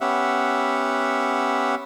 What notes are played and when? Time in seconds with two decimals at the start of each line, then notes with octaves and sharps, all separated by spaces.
0.01 B3 C#4 G4 E5 F#5